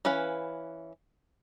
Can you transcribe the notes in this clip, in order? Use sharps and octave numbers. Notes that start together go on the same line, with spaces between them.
E3 C#4 B4 F5